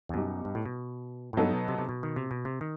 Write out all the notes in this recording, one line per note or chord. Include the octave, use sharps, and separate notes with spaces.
E2
F#2 B2 G3 D#4 G4
G2
A2
B2
A2
G2 F#3 B3 D#4 A4
B2
C3
C3
B2
D#3
C3
B2
C3
D#3